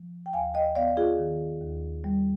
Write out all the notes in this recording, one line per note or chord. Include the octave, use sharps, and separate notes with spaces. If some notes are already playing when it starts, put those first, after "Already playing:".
Already playing: F3
G5
D#2 F5 G#5
D#5 G5
B3 D5 F5
F4 G#4
D#3
D#2
G3